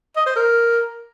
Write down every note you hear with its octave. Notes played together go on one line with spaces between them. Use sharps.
D#5
C5
A#4